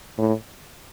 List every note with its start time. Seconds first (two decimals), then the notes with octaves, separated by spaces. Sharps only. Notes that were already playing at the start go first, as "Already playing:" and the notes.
0.18 A2